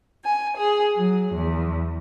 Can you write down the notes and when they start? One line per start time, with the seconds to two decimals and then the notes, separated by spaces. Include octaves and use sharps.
0.24 G#5
0.57 G#4
0.96 F#3
1.34 E2